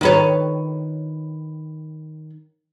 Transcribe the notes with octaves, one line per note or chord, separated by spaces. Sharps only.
D#3 B4 C#5